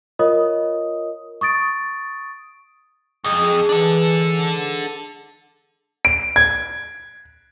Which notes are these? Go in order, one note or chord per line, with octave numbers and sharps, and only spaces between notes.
F4 A#4 C#5 D#5 D#6
C#6 D#6 A6 D7
F2 G#3 D#4 G#4
E3 D4 A4
D7
G#6